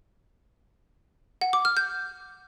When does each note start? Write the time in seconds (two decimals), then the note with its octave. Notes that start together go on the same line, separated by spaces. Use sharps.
1.41 F#5
1.53 D6
1.65 F6
1.77 G6